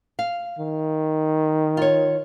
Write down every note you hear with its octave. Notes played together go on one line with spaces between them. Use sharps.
F5
D#3
F4 C#5